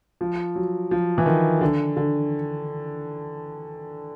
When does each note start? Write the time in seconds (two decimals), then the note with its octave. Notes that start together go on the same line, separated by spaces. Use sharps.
0.21 F3
0.55 F#3
0.91 F3
1.18 E3
1.26 D#3
1.61 D3
1.97 D3